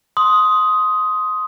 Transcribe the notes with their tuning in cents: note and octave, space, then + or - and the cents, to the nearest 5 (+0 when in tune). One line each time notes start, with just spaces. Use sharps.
C6 +0 D#6 +10